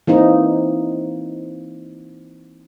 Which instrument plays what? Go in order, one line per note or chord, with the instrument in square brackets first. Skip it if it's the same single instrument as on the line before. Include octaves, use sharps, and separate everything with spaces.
[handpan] E3 A#3 C4 D#4